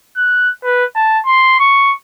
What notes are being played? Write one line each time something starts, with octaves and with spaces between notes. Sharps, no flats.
F#6
B4
A5
C6
C#6